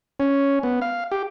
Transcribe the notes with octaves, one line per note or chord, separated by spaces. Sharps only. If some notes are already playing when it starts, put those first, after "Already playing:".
C#4
B3
F5
G4